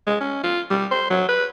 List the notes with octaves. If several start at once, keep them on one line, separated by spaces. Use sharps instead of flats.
G#3
C#4
F4
G3
C5
F#3
B4